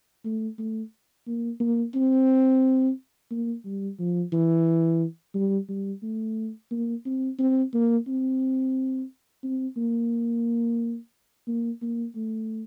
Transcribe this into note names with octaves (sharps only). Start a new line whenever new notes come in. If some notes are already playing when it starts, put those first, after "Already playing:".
A3
A3
A#3
A#3
C4
A#3
G3
F3
E3
G3
G3
A3
A#3
C4
C4
A#3
C4
C4
A#3
A#3
A#3
A3